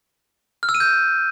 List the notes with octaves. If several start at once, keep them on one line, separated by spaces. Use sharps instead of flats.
F6
E6
D#7
G6